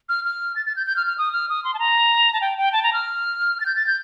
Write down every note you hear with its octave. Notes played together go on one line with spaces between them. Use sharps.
F6
F6
A6
A6
G6
G6
F6
F6
D#6
F6
D#6
C6
A5
A#5
A5
G5
G5
A5
A#5
F6
A6
G6
A6
G6